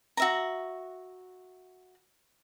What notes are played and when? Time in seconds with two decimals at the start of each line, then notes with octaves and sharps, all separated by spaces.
0.17 F#4 E5 A#5